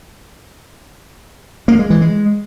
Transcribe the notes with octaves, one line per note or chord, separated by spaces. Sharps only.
A#3
G#3
E3
G#3